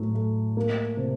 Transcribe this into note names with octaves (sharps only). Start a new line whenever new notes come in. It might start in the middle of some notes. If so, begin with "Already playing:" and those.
Already playing: A2 F#3 A3
A3
A#3
C3